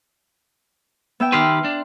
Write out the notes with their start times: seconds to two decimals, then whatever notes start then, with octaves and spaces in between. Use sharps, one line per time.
1.20 B3 E5 G5
1.32 D#3 G4 B4 C6 F6
1.64 D4